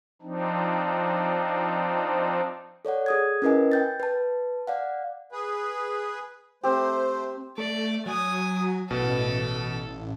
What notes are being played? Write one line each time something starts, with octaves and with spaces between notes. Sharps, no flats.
F3 C4 D4 D#4
A4 C#5 D5 F#5
G#4 D#6 G#6
C#4 E4 A#4 B4 D#5 G#5
G5 G6 A6
B4 A5
D5 F5 F#5
G#4 B4
A3 C4 G4 C5
A3 D5
F#3 G#5 D#6
A1 B2 B3 A4